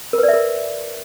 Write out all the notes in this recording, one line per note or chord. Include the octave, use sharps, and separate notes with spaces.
A#4
B4
D5
E5
A#4